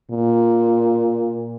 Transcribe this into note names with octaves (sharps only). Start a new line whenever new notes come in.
A#2